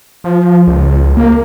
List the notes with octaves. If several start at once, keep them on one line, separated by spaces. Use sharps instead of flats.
F3
C#2
A#3